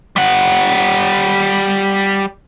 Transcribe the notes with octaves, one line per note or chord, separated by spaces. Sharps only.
G3 F#5